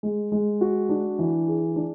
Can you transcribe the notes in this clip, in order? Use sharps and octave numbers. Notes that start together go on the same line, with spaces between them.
G#3
G#3
F#4
D4
E3
G#4
D4